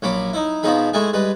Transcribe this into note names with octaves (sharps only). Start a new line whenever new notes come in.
A#1 F#3 C#4 B5 D6
D#4 E4
B2 F3 C4 D#4 G#4 B5
G#3 A3 E4 G#4 G#5
G3 G#3 B4